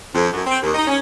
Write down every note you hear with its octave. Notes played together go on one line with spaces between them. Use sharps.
F2
F#2
C4
D#2
D#4
C#4